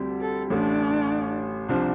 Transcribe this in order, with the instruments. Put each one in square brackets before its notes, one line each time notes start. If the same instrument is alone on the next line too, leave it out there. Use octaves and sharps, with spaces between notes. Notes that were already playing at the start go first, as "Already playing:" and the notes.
Already playing: [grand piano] D2 C3 G3 C4
[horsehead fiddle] A4
[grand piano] A1 A2 A3 [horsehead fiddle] D4
[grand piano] C2 C3 F3 D4